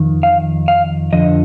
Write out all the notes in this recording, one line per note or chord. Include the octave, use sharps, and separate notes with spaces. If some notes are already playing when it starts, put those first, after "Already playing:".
Already playing: F2 D#3
F5
F5
F2 D3 F3 D#5